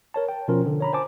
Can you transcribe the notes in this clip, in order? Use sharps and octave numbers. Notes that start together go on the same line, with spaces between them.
A#4 C#5 A5
G5
B2 F3 C#4 F4 A#4
D3
C#5 A#5 B5
C5 G#5 A5 D6